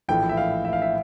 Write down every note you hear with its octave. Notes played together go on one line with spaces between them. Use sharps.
A#1 A2 E3 A3 G5
E5
F5
E5
F5
E5